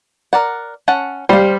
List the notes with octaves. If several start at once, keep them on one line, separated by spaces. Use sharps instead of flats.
A#4 D5 F#5
C#4 F#5 A5
G3 C5 F5